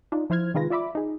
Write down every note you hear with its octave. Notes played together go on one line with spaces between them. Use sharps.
D4 D#4 F4
F3 E4 C5 F6 G#6
C3 D#3 G#3 F4 B4 A#6
F4 D5 E5 B5 D6
D#4 G#4